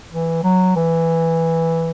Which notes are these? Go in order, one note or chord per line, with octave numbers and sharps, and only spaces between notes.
E3
F#3
E3